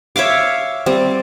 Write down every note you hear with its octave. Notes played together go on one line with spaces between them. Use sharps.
C#5 E5 F5 D6
G3 C4